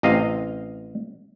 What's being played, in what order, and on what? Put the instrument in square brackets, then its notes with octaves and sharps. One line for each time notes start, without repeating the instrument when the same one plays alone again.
[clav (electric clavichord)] A1 C3 D#5 F5